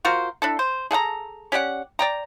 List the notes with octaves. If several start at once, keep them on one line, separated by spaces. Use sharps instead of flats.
F4 F#4 A#4 C5
D4 E4 A4
C5
G#4 A4 F#5 A#5
C#4 G4 D5 F#5
D5 G5 A#5